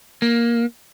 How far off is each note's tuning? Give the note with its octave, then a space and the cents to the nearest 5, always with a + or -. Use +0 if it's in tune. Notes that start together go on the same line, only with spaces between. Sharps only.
A#3 +5